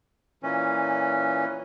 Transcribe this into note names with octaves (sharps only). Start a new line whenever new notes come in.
A#2 E3 C#4